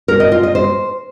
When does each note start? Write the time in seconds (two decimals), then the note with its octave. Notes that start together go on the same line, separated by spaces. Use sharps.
0.08 A#4
0.20 D#5
0.32 F4
0.43 D#5
0.55 C5